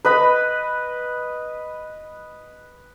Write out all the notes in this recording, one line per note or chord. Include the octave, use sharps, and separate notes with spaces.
B4 D#5 B5